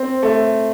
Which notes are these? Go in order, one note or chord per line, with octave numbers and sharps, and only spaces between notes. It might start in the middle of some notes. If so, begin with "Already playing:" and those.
Already playing: C4
A3